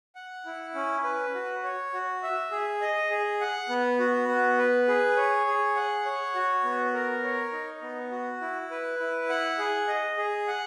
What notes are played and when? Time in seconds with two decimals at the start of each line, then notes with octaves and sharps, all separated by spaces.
0.15 F#5
0.46 E4
0.75 C#4
1.04 B4
1.34 F#4
1.64 C#5
1.93 F#4
2.23 E5
2.51 G#4
2.81 D#5
3.10 G#4
3.41 F#5
3.69 B3
3.99 F#4
4.29 B3
4.58 B4
4.88 G#4
5.16 C#5
5.47 G#4
5.76 F#5
6.05 C#5
6.35 F#4
6.64 B3
6.94 A#4
7.23 C#5
7.52 D#4
7.82 B3
8.11 F#4
8.41 E4
8.71 B4
8.99 E4
9.29 F#5
9.58 G#4
9.88 D#5
10.17 G#4
10.48 F#5